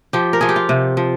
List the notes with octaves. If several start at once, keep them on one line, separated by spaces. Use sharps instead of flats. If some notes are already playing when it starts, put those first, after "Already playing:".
F3 G4
A#4
F3 G#4
G4
F4
C3
F3